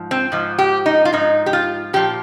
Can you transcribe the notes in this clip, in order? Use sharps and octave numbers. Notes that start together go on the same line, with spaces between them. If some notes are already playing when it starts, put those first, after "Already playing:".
Already playing: G#2 F3
C4
G#2 F3
G4
D#4
F4
G#2 F3 D#4
G4
F4
A#2 F3 G4